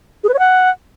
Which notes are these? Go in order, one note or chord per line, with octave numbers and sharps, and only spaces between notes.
G#4
B4
C#5
F#5